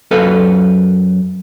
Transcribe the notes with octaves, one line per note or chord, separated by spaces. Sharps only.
F#2 A4 B4 F5